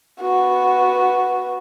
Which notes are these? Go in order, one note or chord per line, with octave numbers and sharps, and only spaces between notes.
B3 F#4